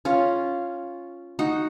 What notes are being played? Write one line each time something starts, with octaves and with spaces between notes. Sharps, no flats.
C#4 F4
D#4 F#4